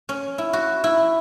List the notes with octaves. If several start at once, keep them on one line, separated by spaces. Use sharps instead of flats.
C#4
E4
F#4
E4